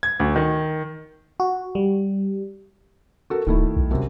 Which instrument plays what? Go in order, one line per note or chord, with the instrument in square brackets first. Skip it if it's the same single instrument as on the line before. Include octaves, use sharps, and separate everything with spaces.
[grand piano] G#6
D2
D#3
[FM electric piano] F#4
G3
[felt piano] F#4 A4 A#4
[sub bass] D1 [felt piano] D#3 A3 E4
[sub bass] B1
[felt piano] F#2 C3